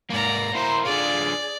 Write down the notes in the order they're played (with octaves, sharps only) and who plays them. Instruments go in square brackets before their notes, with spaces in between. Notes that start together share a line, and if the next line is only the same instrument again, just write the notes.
[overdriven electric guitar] G#2 A#3 [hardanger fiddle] D5 A#5
[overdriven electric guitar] A#3 E4 [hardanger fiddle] C5 [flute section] A#5 C6
[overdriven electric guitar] D3 F4 [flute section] G#4 [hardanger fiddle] D5